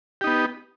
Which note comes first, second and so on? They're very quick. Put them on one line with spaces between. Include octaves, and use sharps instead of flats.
G4 D#4 B3